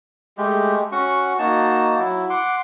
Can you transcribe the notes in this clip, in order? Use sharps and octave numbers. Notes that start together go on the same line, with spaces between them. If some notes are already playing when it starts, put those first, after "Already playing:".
G#3 A3 G4
C#4 F#4 F#5 C#6
A#3 D#4 F#4 A5
F#3 E4
F#5 C6 D6